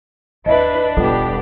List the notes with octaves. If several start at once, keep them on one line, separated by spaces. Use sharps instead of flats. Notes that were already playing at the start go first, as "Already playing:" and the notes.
D#2 D4 E4 B4 D#5 E5
E1 G3 B3 F4 G4 A4